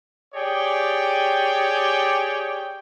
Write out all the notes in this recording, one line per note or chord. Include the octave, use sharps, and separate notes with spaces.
G4 G#4 C#5 D5 G5